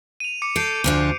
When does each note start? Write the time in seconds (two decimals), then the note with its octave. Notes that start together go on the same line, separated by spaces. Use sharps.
0.20 D#7 F7
0.42 D6 C#7
0.56 A4 G6 C7 D7
0.84 D2 F3 D4